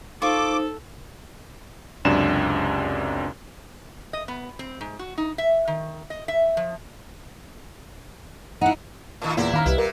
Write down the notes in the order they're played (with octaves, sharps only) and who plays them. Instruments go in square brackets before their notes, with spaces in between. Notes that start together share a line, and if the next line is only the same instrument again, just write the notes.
[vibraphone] D#4 C5 [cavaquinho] F4 C#6 [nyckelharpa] A4 [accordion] D6
[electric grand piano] C#2 F#2 C3 D4 E7
[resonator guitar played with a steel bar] D#5
B3
C4
G#2
F#4
D#4
E5
D#3
D#5
E5
F3
[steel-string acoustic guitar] D#4 E4 [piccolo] F#5
[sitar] A2 D#3
[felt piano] E2 A#2 [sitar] A#3 E4
[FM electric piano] D#3 [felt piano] F5 A#5 F6
[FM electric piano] C2 [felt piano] G3 B4 [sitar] E4
[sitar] A#2 [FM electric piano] A#4